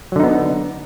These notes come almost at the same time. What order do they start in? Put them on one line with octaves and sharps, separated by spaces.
F#3 D3 D#4 B3